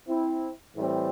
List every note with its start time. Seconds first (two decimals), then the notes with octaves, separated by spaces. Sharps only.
0.08 C4 E4
0.75 A2 E3 G3 C4